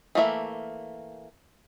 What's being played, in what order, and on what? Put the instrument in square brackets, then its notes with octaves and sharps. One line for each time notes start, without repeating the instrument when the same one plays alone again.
[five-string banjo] E3 A3 A#3 E5